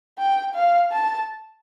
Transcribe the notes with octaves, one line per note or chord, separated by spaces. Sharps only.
G5
F5
A5